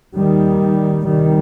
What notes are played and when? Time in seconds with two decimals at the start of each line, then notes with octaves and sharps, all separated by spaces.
0.16 D#2 D#3 G3
1.06 D2 C3 D#3 G3